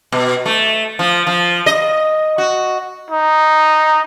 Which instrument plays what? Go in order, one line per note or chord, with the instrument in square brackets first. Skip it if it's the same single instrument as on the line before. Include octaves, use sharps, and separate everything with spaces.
[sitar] B2
A3
F3
F3
D#5
F#4
[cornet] D#4